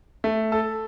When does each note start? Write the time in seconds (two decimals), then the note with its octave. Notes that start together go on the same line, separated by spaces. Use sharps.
0.24 A3
0.52 A4